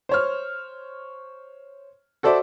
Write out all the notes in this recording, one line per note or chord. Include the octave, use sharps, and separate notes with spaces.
C5 C#5 F6
F#4 A4 C5 D5 E5